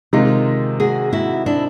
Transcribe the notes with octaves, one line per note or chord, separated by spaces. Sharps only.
C3 D#3 G#3 D#4 F4
F#4 G#4
E4 F#4
D4 E4